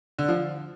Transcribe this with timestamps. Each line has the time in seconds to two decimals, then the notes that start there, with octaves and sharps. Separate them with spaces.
0.19 D3
0.28 F3